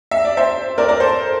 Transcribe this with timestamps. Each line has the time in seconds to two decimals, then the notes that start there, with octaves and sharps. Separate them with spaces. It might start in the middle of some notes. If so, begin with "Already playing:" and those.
0.11 E5
0.25 D5
0.37 C5 E5
0.78 A#4 D5
0.88 A#4 D5
1.00 A4 C5